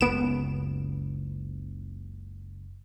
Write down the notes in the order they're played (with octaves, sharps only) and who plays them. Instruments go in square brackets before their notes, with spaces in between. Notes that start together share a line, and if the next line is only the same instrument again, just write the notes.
[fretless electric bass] F#1 C#2 [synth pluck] B3 D7 E7